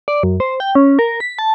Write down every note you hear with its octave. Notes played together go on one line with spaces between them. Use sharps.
D5
F#2
C5
G5
C#4
A#4
B6
A5